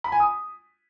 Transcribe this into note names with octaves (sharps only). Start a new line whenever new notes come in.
B5
G#5
D#6